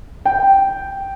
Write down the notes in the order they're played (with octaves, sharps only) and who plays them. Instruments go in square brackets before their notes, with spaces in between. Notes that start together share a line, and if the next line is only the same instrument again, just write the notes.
[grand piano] G5